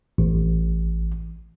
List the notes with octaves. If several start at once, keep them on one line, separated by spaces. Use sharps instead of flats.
A1